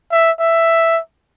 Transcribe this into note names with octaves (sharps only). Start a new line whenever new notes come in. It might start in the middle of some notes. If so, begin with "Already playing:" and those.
E5
E5